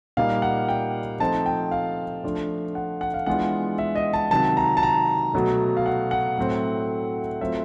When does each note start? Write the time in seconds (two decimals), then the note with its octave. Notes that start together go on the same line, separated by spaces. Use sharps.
0.17 A#2 G3 A#3 D#4 F5
0.42 F#5
0.69 G5
1.20 F3 A3 C4 D#4 A5
1.46 G5
1.71 F5
2.24 F3 A3 D4 F4
2.75 F#5
3.01 F#5
3.14 F5
3.26 E3 G#3 B3 D4 F4 F#5
3.79 E5
3.95 D#5
4.13 A5
4.31 C3 D#3 F#3 A5
4.57 A#5
4.77 A5
4.83 A#5
5.34 B2 F#3 A3
5.77 F5
5.86 F#5
6.11 F#5
6.38 A2 F#3 A3 C4
7.41 F#3 A3 C4 F4 E5